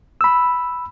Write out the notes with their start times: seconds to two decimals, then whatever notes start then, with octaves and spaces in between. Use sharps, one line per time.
0.21 B5 E6